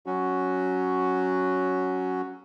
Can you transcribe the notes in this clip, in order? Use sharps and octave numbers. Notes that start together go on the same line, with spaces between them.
F#3 C#4 F#4